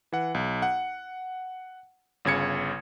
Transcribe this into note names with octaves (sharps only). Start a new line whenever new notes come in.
E3 F#5
B1
F#5
G1 C#3 G#6 C#7